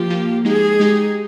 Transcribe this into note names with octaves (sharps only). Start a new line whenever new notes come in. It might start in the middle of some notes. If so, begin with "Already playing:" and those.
Already playing: F3 A#3 F4 G4
F3 A#3 F4
G#3 D#4 G4 G#4
G#3 D#4 G4